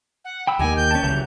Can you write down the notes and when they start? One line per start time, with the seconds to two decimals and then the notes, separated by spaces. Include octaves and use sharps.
0.25 F#5
0.47 G5 B5 E6
0.59 D#2 D#3 A#3 G4 D#5 G5 G#5
0.77 G6
0.91 C#4 A5
1.03 C#2 C#3 E3 F#3 G3